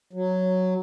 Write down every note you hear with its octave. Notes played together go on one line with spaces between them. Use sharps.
F#3